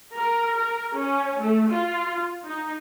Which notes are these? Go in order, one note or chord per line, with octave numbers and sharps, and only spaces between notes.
A#4
A#4
C#4
A3
F4
D#4